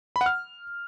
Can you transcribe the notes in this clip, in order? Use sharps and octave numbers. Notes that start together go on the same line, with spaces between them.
B5
F#5
F6